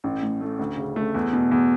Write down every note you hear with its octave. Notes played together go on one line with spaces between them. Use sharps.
A1
A2
A3
D2
C#3
A3
E2
B2
E2